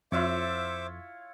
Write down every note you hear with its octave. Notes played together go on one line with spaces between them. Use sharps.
F2 E4 F4 C5 C#5 E5 D6